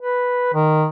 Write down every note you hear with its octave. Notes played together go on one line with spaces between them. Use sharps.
B4
D#3